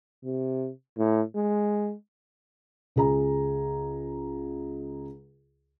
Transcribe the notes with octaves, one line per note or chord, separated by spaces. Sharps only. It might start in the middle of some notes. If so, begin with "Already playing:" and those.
C3
A2
G#3
C#2 G#4 A#5